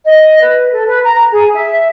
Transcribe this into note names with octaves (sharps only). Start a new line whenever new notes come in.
D#5
B4
A4
B4
A#5
G#4
E5